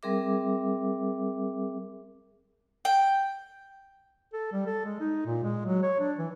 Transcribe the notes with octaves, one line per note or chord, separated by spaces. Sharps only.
G3 C4 G#4 A#4 E5 D6
G5
A4
G3
A4
G#3
D#4
A#2
G#3
F#3
C#5
D4
E3